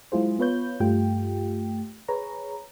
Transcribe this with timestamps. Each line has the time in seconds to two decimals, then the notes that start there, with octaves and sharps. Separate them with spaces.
0.12 F#3 G#3 E4 F4 G#4 C5
0.39 B3 F4 B4 C#5 G6
0.80 G2 A3 F4 G4 G5
2.08 G#4 B4 C#5 A#5